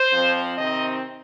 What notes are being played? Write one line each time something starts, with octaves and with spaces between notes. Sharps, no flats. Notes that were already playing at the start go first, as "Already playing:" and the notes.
Already playing: C5
F2 F3 C4
C3 D#3 C4 D#4 D#5